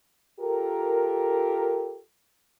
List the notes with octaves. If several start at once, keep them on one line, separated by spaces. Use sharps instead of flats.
F4 G4 A4 A#4